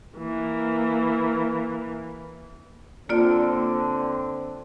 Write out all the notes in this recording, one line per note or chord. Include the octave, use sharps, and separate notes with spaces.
E3 A#3
D3 A#3 C4 F4 D5